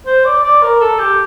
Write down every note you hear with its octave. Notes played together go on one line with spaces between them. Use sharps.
C5
D5
D5
A#4
A4
G4